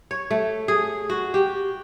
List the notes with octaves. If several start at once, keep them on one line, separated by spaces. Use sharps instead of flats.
C#5
A3
G#4
F#4
G4